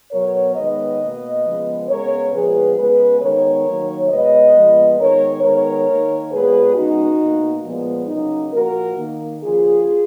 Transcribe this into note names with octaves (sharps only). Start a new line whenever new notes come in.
B2 F#3 B3 A#4 C#5
D#3 G#3 B3 B4 D#5
B2 A#3
C#3 F3 G#3 B3
C#3 G#3 B3 A#4 C#5
A#2 F3 G#3 B3 G#4 B4
C#3 G#3 B3 G#4 B4
D#3 G#3 B3 A#4 C#5
D#3 F#3 A#3
B2 G#3 B3 B4 D#5
A#2 F3 G#3 B3
D#3 G#3 B3 A#4 C#5
D#3 G#3 B3 A#4 C#5
D#3 A#3
A#2 G#3 B3 G#4 B4
C#3 G#3 B3 D#4 F#4
B2 A#3
A#2 F3 G#3 B3
C#3 F#3 A#3 D#4
A#2 F3 A#3 F#4 A#4
D#3 A#3
C#3 F3 A#3 F4 G#4